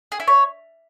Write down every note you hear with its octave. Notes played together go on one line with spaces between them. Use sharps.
G#4
E4
C#5